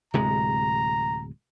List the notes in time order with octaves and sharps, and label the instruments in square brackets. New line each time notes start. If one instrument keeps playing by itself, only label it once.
[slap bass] D1 C3 G#3 [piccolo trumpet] A#5